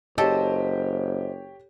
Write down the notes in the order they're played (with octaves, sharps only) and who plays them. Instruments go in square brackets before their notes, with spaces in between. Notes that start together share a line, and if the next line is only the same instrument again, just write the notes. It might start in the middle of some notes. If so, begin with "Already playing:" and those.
[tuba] F#1 [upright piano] G4 C#5 [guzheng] A4 [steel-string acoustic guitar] C5 D#5